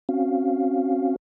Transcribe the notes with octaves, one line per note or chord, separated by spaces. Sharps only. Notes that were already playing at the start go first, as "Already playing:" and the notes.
C4 C#4 F#4 F5